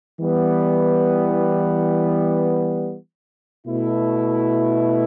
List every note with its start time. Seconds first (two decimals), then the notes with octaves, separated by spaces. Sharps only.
0.19 E3 G3 B3
3.66 B2 A3 E4